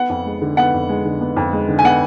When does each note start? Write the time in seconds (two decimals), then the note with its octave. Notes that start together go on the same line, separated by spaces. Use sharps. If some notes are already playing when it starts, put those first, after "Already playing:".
Already playing: B3 F#5
0.10 F2
0.26 G#3
0.42 D3
0.57 B3 F#5
0.74 F2
0.89 G#3
1.06 D3
1.21 B3
1.36 F2
1.53 G#3
1.69 D3
1.79 G#5
1.85 B3 F#5